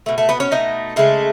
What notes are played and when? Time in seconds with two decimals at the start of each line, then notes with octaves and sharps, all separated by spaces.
0.06 B2 A3
0.18 A3 A4
0.29 B3 B4
0.40 C#4 C#5
0.51 B2 A3 D#4 D#5
0.96 C#3 G#3 A3 A4